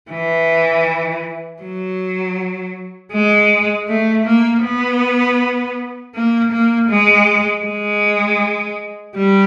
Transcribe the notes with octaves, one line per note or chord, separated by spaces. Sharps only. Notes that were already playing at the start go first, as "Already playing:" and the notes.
E3
F#3
G#3
A3
A#3
B3
A#3
A#3
G#3
G#3
G3